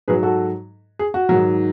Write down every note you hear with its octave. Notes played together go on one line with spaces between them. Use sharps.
G#2 F#3 G#4 B4
F#4 A4
G#4
F#4
G#2 D#3 F#3